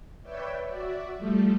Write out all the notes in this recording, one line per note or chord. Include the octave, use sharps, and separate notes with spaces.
B4 C#5 D5 E5 G5
F#4 D5 E5
F3 G3 A3 A4